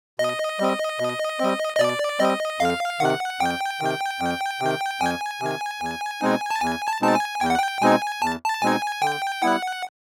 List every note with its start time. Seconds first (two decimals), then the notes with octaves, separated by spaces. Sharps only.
0.19 B2 D#5
0.60 G3 C4
1.00 B2
1.40 G3 C4
1.76 D#5
1.79 B2 D5
2.20 G3 C4 D#5
2.60 F2 F5
3.00 C3 D#3 F#5
3.40 F2 G5
3.80 C3 D#3
4.20 F2
4.61 C3 D#3
5.01 F2 G#5
5.41 C3 D#3
5.81 E2
6.21 B2 G#3 C4 D#4
6.50 A5
6.61 E2 G#5
6.88 A5
7.02 B2 G#3 C4 D#4 A5
7.15 G#5
7.41 E2 G5
7.50 F#5
7.58 G5
7.82 B2 G#3 C4 D#4 G#5
8.22 E2 A5
8.44 A5
8.62 B2 G#3 C4 D#4 G#5
9.02 D3 G5
9.42 G3 B3 E4 F#5